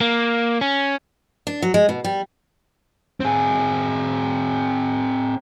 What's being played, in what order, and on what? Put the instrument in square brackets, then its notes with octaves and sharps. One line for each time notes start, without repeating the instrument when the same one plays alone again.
[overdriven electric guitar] A#3
C#4
[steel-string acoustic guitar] D4
F#3
G#3
B2
G3
[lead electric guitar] C4 G#4